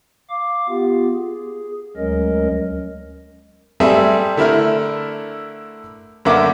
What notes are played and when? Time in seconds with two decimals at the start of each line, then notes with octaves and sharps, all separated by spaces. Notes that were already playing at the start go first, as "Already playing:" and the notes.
0.30 F5 D6
0.69 B3 F4 G4
1.14 G#4
1.96 D2 F#3 G#3 C#4 A#4 D#5
3.80 G3 C4 G#4 A4 E5
4.37 D3 A3 E4 A#4 E5 F6
6.25 F#2 D3 A#3 E5 F#5 D6